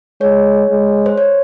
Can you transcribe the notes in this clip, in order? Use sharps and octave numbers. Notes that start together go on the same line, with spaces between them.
G#3 C#5
G#3
C5
C#5